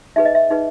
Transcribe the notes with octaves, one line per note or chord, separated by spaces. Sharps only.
D#4 G#4 B4 E5
D#5
E5
D#4 G#4 B4